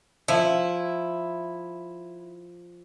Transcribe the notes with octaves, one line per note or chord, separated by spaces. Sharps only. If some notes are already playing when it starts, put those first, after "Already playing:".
F3 E4